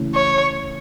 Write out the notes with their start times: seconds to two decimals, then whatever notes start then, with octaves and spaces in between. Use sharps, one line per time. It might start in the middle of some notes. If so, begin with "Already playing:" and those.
Already playing: C#3 E3 A3 C#4 E4
0.15 C#5